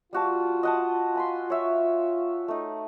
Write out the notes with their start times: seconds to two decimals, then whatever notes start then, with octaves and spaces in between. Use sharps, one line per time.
0.13 G3 F4 F#4 A5
0.63 D#5 F#5 A5
1.15 G#5 B5 C6
1.50 C#5 E5
2.48 A3 D#4